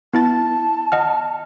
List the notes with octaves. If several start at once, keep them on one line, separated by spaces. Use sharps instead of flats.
B3 E4 A5 A6
D#5 F#5 F6